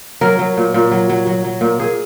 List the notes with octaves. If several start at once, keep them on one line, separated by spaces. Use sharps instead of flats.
F#3 A#4
F#3
A#2
A#2
F#3
F#3
F#3
F#3
A#2
A#2 G#4